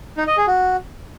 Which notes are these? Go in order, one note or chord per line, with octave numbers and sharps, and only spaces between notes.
D#4
D#5
G#4
F#4